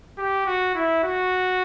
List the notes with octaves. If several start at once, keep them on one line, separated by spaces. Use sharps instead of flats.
G4
F#4
E4
F#4